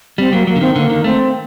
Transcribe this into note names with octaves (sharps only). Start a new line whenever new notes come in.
G3 C4
F#3 A#3
F#3 A#3
D3
D#3 C4
D3 A#3
D#3
A3 C4